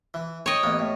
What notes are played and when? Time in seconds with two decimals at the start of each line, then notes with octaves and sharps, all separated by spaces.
0.14 E3
0.46 C#5 D#5 G5
0.63 A1 A#3 B3
0.79 A2